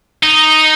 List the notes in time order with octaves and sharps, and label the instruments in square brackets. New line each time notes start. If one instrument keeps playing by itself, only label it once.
[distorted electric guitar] D#4